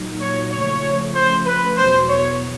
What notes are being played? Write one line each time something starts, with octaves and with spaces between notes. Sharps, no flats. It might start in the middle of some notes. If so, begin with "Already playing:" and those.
Already playing: A#2 F#3 A#3 D#4
C#5
C#3 F3 A3 C#5
C5
B4
E2 B2 F#3 B3 C5
C#5